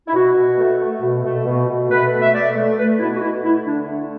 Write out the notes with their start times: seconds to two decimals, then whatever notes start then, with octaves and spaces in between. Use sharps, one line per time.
0.07 E4
0.14 B2 F#4
0.36 B2
0.58 A3
0.80 A3
1.02 B2
1.24 A3
1.45 B2
1.68 B2
1.89 A3 B4
2.12 B2
2.22 E5
2.33 A3 D5
2.55 A3
2.77 A3 B4
2.99 B2 E4
3.15 F#4
3.21 A3 E4
3.43 A3 E4
3.65 D3 D4
3.87 A3